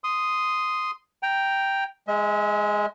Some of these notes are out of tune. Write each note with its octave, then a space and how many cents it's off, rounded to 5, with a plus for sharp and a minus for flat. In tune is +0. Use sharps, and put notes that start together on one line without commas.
C6 -10 D#6 +0
G5 +0 A#5 +0
G#3 +0 E5 -45